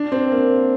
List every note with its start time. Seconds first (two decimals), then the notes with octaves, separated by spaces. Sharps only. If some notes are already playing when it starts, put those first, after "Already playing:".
Already playing: D4
0.12 C4
0.32 A#3